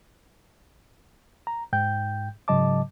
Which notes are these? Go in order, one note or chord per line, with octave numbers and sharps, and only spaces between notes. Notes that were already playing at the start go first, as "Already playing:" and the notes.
A#5
G#2 G5 G6
G#2 C#3 F#3 D#5 A5 D6